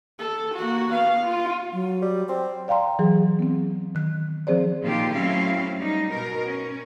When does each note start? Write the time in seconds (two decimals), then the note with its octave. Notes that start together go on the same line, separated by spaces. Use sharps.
0.19 A4
0.55 A#3 F#4
0.92 B3 F5
1.24 F4
1.73 F#3
2.02 G3
2.29 C4 D5
2.68 D5 F5 G5 A#5 C6
2.99 E3 F#3 G#4
3.39 B3 C4
3.95 D#3 F#6
4.47 F3 C4 G#4 C5 D5
4.84 A#2 D#3 F3 A#3 F4 G4
5.13 F#3 A3 C4 C#4 E4 F5
5.77 G3 D#4
6.10 B2 A#4
6.46 C#4